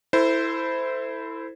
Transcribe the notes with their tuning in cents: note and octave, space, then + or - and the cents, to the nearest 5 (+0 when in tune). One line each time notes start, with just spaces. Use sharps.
E4 +0 A4 +25 C5 -15